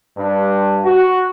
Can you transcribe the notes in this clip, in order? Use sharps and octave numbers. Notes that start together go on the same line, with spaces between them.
G2
F#4